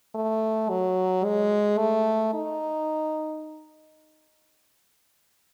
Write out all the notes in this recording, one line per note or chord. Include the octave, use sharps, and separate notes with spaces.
A3
F#3
G#3
A3
D#4